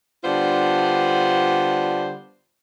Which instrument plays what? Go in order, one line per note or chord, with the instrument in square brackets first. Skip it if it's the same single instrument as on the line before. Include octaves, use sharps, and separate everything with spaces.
[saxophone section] D3 G3 B3 D4 F4 C5